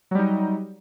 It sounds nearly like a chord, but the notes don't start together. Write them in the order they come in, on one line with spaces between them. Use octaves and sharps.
F#3 G3 D#4